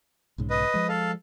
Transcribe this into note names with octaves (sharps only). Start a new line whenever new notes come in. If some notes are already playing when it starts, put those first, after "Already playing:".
B1 G#2 C#3
B4 D#5
F3 G#3
A4 F5